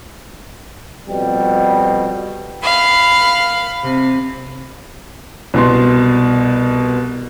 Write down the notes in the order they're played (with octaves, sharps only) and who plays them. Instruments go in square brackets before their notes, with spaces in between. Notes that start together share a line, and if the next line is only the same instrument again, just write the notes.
[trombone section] F2 B2 G3
[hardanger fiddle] F5 [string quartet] B5
[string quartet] C3
[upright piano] C2 B2 C6